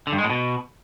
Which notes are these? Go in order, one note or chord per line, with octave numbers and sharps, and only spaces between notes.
D3
G2
G#3
A2
B2